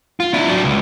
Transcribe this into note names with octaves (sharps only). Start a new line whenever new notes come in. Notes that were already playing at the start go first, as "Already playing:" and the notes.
F4
D4 E4
F#3 D4
C#2